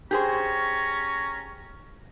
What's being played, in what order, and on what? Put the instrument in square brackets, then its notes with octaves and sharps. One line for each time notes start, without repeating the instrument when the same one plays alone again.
[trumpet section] C#4 A#5 C#6 [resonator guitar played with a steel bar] G4 G#4 C5